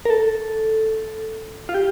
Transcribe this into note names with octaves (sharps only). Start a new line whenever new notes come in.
A#4
A4
F4
G4